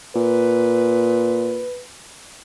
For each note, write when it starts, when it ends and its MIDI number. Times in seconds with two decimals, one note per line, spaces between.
0.16 1.65 46
0.16 1.82 71